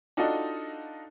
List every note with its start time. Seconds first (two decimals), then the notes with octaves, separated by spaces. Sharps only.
0.17 D4 D#4 F4 F#4 A4 D#5